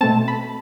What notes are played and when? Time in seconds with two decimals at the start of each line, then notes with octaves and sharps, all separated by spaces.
0.01 B2 A3 C4 A5
0.28 B5